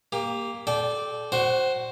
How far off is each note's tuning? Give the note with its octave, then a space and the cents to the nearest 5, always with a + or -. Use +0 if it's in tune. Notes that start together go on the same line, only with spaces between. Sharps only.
A#3 +0 G4 +25
A4 -30 D5 +0 G5 -5
F#4 +0 C5 +5 F#5 +35